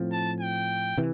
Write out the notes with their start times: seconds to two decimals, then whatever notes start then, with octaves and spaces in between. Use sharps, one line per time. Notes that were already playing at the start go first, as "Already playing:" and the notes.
Already playing: A2 F3 C4
0.12 A5
0.41 G5
0.98 C3 E3